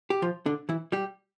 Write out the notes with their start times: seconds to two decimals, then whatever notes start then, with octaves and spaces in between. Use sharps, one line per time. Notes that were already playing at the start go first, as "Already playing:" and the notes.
0.10 G4
0.22 F3 F4
0.46 D3 D4
0.69 E3 E4
0.92 G3 G4